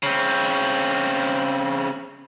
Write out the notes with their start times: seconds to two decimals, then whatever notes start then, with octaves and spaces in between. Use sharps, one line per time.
0.03 C#3 C4